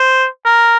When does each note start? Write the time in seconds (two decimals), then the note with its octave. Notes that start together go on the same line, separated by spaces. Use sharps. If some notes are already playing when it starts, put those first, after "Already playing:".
Already playing: C5
0.45 A#4